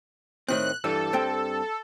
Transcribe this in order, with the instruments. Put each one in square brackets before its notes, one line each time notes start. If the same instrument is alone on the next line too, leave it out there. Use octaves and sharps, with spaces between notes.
[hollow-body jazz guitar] A2 D#3 C4 [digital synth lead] F#6
[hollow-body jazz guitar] G2 E3 G3 [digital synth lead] A4
[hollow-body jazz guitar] G2 C4 G5